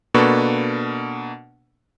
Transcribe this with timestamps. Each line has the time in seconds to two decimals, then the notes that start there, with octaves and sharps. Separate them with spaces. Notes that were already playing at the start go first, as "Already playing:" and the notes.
0.14 B2 A#3 D4 A4 B4 C#6